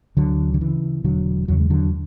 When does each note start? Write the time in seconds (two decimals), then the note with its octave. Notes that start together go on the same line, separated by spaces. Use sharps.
0.17 D2 D3 F#3
0.54 D3
0.61 C#3 E3
1.04 E1 D3 F#3
1.48 E2 C#3 F#3
1.60 G#3
1.70 D3 F#3